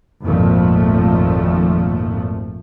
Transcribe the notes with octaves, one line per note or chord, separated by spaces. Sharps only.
G#1 F2 A#2 F3 A3